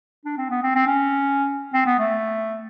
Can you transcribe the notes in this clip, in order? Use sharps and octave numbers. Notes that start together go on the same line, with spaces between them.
D4
C4
B3
C4
C4
C#4
C4
B3
A3